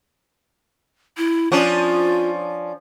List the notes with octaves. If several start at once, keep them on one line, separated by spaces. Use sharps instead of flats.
E4
F3 C#4 D4 F4